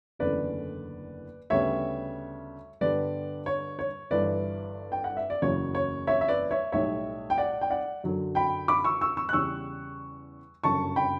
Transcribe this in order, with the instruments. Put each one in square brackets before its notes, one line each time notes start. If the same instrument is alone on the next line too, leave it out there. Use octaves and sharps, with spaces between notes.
[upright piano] F#1 E2 D3 A3 C#4 B4 D5
D2 C#3 G3 B3 C#5 E5
G2 D3 G3 B3 B4 D5
C#5
C#5
G1 G2 E3 B4 D5
G5
F#5
E5
D5
F#1 E2 C#3 F#3 C#5
C#5
C#5 E5
E5
B4 D5
C#5 E5
B1 A2 G3 C#5 E5
G5
D5 F#5
G5
D5 F#5
F#2 D3 F#3
G5 B5
B5 D6
C#6 E6
C#6 E6
C#6 E6
F#6
E2 C#3 G3 C#6 E6
G1 F#2 C#3 A5 C#6
G5 B5